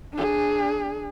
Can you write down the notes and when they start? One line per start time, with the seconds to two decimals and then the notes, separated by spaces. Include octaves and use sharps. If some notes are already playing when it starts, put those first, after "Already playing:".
0.13 D4 G#4